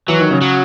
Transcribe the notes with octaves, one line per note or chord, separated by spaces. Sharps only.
E3 F#3
D#3
C#3
F#3